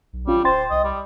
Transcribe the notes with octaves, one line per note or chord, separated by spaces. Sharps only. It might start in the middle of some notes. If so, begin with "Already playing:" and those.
B1
A1 G3 C#4 F4
D1 C5 G5 C6 A6
C2 D#5
G3